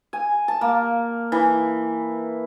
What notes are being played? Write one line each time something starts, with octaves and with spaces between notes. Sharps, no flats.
G#5
A5
A#3
E3